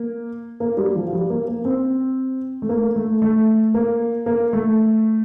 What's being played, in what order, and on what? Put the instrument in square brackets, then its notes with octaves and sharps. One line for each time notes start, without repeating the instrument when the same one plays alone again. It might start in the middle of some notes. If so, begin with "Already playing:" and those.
Already playing: [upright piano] A#3
A#3
G3
F3
F3
G3
A#3
A#3
C4
A3
A#3
A3
A3
A#3
A#3
A3